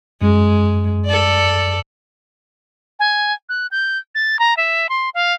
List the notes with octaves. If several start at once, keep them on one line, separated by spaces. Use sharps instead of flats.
F#2 G#3
A4 D5
G#5
F#6
G6
A6
A#5
E5
C6
F5